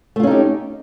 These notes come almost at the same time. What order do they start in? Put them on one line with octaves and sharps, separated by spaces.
A3 F4 C#4 D#4 G4